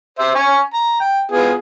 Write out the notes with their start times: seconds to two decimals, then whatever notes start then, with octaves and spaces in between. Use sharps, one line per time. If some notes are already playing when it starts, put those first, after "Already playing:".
0.19 C5 E5
0.35 G#5 C#6
0.74 A#5
1.00 G5
1.31 B3 F4 G#4